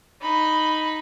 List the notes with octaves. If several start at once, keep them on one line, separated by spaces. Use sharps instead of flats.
D#4 B5